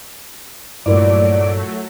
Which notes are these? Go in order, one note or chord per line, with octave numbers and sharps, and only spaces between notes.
G2 A#2 F#3 A3 E4 F4 A#4 D5